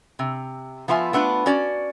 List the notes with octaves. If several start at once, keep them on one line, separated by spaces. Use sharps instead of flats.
C3
F3 B3 F4 E5 G#5
A3 B3 D4 F4 B4
C#4 F#4 D5